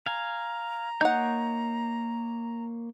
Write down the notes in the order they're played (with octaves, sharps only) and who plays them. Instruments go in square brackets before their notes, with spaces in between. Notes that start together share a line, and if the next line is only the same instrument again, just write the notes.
[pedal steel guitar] F5 G#5 [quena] A#5
[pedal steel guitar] A#3 C#5 G6 [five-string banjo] D#4 F#5